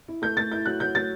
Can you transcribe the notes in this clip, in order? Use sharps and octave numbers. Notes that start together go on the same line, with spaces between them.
E4
A3 G6
A3 A6
E4 G6
F#3 F#6
F#3 G6
F#3 A6